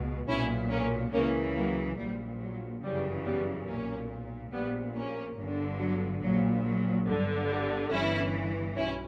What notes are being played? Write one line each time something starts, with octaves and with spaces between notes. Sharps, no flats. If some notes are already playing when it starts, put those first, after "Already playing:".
Already playing: C#2 B2
B1 A#2 C#4 E4
A#3 C#4
C#2 C#3 E3 A#3 C#4
F#3 A#3
A#1 A#2 G3
F#3
G1 F#2 C#3 E3 G3
G3 B3
B1 A#2 A#3 C#4
A#1 A#2 G3 B3
A#3 C#4
G1 G2 D3
F#3
A#1 A#2 F#3
F#3
G1 G2 D3
G3
G1 G2 E3 C#4 E4
B1 C#4 E4